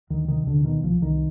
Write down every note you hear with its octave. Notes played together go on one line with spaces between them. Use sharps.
D2 D#3
C3 D#3
D2 D3
B2 D#3
C2 F3
C2 D#3